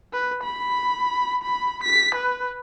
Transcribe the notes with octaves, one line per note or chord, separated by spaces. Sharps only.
B4
B5
B5
B6
B4